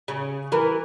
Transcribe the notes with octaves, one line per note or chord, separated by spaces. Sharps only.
C#3
E3 A#4